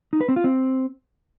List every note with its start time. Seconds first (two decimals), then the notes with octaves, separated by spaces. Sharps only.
0.13 D#4
0.21 B4
0.28 C4
0.36 F4
0.44 C4